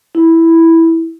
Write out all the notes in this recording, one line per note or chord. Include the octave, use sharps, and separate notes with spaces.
E4